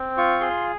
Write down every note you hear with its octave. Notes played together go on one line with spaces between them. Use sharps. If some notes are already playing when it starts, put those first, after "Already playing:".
Already playing: C4
F4 C#6
G#4 C6